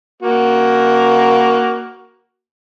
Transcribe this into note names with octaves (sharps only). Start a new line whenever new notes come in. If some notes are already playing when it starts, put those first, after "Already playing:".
A#3 F#4